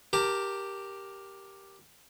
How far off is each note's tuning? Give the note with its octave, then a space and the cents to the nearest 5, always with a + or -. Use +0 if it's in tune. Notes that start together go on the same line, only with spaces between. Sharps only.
G4 +0 A#4 +10 A5 +40